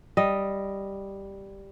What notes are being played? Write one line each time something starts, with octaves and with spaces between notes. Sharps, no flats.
G3 D#5